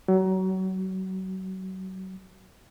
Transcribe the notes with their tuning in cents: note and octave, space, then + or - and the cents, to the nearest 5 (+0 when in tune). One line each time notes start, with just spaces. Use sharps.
F#3 +30